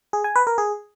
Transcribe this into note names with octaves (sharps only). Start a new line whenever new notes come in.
G#4
G#5
B4
A#4
G#4